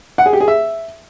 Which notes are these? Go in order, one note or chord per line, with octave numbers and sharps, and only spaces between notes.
F#5
G#4
G4
G#4
E5